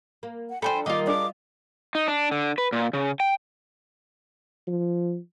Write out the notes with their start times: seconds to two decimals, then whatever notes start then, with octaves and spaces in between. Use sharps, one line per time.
0.23 A#3
0.50 F#5
0.62 F3 D4 A4 C5 G5 G#5 B5
0.86 D#3 G3 A#3 F4 D#5 D6
1.07 D4 G#4 A#4 D6
1.95 D#4
2.08 D4
2.32 D3
2.58 B4
2.72 A#2
2.93 C#3
3.20 G5
4.67 F3